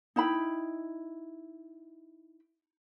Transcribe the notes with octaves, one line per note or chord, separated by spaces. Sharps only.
D#4 E4 G5 B5